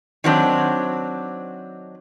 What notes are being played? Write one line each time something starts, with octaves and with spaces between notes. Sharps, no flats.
D#3 F#3 C4 D4